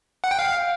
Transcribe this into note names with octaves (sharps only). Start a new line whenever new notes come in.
F#5
G5
F5